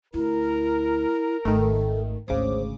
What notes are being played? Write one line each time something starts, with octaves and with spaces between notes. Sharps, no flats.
D2 E4 A#4
G#1 D#3 A3 A4
G#1 D2 C#3 C5 D6 D#6